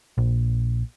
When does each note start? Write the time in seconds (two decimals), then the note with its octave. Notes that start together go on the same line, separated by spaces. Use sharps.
0.18 A#1